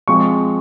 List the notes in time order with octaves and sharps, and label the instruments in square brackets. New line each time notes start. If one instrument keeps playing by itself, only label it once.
[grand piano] F3 G#3 C4 C#6